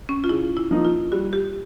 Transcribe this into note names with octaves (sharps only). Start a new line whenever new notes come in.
C#4
F4
C#3 E4
E4
F3 A#3 D#4
F4
G3 F#4
G4